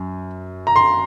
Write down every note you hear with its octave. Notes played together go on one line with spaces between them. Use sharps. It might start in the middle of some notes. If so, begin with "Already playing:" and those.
Already playing: F#2
A#5
C6